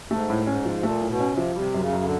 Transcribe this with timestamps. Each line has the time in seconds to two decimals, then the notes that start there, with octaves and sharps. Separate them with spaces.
0.10 G#2 A3
0.30 A2
0.47 G#2 C#4
0.65 F3
0.83 A#2 A3
1.02 A2
1.08 B2
1.20 C#4
1.32 C3
1.37 F3
1.56 C3 G3
1.74 F#2
1.80 C#3
1.93 F#2
2.03 D3